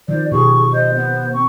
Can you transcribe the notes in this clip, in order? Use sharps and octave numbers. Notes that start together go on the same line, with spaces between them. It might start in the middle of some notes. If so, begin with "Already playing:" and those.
D#3 F3 C5 D5
B2 G4 G#4 C#6
C5 D#5
B3
C4 C#6